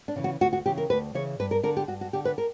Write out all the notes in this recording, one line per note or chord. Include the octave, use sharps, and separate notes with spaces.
D4
C#3 E3
F#4
D2 F#4
F#4
C#3 E3 G4
A#4
D2 B4
C#3 E3 C#5
G2 B4
A#4
D3 A#4
G4
G2 F#4
F#4
D3 G4
B4
A#4